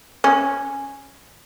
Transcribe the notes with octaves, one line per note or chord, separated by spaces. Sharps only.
C#4